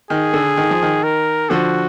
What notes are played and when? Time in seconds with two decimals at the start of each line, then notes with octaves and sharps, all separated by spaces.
0.10 D#3 G#4
0.33 D3
0.57 D#3
0.71 F3
0.82 D#3
1.03 A#4
1.50 D3 F3 F#4